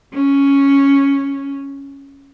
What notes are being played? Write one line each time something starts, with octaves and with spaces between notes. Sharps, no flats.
C#4